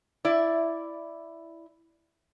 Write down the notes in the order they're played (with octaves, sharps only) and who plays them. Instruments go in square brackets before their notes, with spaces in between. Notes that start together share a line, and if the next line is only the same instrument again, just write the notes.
[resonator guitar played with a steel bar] E4 D5